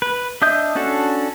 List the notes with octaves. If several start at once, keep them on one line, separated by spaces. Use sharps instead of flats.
B4
D4 D#5 E5 D#6 G6
C#4 D4 F#4 A4